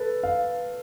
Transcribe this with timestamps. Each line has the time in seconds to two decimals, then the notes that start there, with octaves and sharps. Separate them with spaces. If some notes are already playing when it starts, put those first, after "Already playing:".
Already playing: A4 B4
0.23 F5